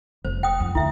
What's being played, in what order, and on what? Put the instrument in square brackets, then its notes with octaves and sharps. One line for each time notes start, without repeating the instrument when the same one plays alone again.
[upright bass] F1 [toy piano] C5
[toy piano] G5 D#6
[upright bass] F2
[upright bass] D2 [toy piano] E4 E5